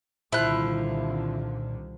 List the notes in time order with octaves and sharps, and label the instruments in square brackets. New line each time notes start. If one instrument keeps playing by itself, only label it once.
[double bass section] C2 D3 D#3 [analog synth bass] A#2 [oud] F3 [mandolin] E4 F#6